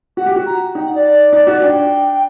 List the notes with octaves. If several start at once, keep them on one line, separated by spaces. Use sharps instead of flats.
F#4 F#5
G4
F#4
A#5
D#4 G5
F#5
D5
D#4
F#4
D4 G5